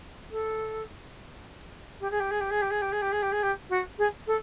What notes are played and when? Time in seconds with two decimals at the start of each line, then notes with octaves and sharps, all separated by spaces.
0.31 A4
2.00 G4
2.10 G#4
2.20 G4
2.30 G#4
2.40 G4
2.50 G#4
2.61 G4
2.70 G#4
2.81 G4
2.92 G#4
3.01 G4
3.12 G#4
3.22 G4
3.32 G#4
3.42 G4
3.69 F#4
3.98 G#4
4.26 A4